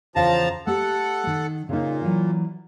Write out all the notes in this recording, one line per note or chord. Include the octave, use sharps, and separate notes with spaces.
E2 C#3 F3 F5 A5 A#5
A3 G4 A4 F#5
D#3
A#2 C#3 D#4
E3 F#3